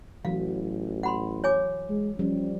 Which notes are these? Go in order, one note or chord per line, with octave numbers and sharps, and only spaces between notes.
A1 E3 F#3 F5
F#5 B5 C6
C#5 G#5 D6
G#3
F3 G3 C#4